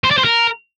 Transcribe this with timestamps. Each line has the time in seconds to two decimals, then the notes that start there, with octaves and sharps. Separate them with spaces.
0.04 C5
0.11 D5
0.18 C5
0.25 A#4